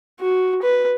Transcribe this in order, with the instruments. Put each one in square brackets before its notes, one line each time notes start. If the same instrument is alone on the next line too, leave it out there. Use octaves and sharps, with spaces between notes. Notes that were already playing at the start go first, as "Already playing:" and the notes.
[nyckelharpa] F#4
B4